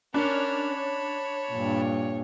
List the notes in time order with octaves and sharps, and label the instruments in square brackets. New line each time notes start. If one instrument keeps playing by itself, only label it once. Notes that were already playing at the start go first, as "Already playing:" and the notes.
[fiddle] C#4 A#4 [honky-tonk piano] D4 [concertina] A5 B5
[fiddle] C#5
[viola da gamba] G2 A#2